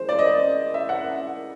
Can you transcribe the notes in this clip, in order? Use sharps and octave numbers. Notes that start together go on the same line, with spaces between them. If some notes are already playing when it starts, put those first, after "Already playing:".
Already playing: E3 G#3 C5
D5
D#5
E5
F#5